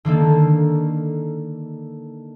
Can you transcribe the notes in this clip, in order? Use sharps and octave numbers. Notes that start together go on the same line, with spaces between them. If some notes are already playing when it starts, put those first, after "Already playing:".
D3 D#3 A#3 A4